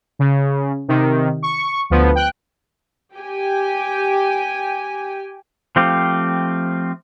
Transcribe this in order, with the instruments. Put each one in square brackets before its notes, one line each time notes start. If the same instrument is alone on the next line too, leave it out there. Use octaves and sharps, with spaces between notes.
[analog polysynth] C#3
C3 D#3
C#6
D2 F3 B3
G5 F#6
[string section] G4 G5 G#5
[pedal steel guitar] F3 A3 C4 F4 G4